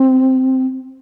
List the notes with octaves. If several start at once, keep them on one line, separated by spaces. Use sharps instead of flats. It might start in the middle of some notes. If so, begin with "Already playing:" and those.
Already playing: C4